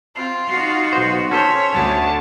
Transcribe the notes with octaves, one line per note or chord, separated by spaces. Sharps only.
C4 F4 C7
D#4 F#4
B1 C5
C#4 A4 C5 C#5 B6
D2 D3 A5